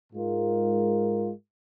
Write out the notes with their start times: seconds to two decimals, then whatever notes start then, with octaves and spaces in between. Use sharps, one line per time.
0.12 G#2 G#3 F4 A#4